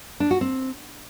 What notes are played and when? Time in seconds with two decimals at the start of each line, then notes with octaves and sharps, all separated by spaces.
0.20 D4
0.31 F#4
0.41 C4